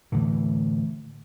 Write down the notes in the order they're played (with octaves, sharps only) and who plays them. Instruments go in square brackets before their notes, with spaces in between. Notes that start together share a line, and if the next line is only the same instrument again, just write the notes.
[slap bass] A2 D3 E3